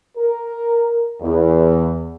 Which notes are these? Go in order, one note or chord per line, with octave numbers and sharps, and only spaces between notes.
A#4
E2